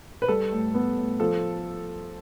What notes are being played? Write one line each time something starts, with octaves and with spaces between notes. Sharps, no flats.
B4
G3 A4
A2
B3
A2
F3 A4